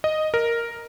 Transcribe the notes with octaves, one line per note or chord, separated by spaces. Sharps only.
D#5
A#4